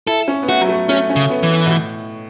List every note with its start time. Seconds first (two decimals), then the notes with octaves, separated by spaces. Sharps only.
0.07 E4 A4
0.28 C#4
0.42 B3
0.48 A3 F#4
0.61 F#3
0.69 A3
0.89 A3 C#4
1.10 C#4
1.16 C#3
1.30 B3
1.43 E3
1.51 B3
1.66 B2
1.71 A2